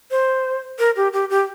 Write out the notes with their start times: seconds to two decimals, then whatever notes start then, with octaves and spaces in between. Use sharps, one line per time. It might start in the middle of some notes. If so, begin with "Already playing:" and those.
0.11 C5
0.79 A#4
0.96 G4
1.13 G4
1.30 G4